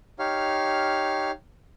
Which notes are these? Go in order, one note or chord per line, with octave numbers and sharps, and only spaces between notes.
D#4 G4 C#5 F5 F6